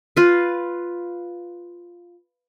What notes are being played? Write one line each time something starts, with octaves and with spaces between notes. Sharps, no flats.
F4 B4